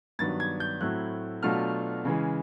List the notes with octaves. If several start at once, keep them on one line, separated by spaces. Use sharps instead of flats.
G2 D#3 F#3 B3 D4 A6
G#6
G6
A2 F#3 A3 C4 E4 F#6
B2 F#3 A3 D4 F4 F6
C#3 E3 G#3